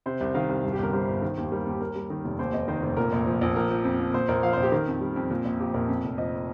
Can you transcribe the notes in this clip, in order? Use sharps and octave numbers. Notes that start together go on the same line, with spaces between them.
C3 C5
C2
D#3 F5
C2
G2
G4
G1 A#4
G3 C5
G1
D#3
D#2
G3 A#4
D#2 G4
D#2 A#4
G3
D#3
F1
D#2 C5
F1 D#5
D#3 C5
F1
A#2 A#4
A#1
F3
A#1
F3 A#4
F3
F2
F2
A#2 C5
A#1 A#4
F3 F5
C5
A#1
G4
D#3 A#4
F2
G3
F2
A#2
A#1
F3 G4
A#1 A#4
F2
F1
F3 D#5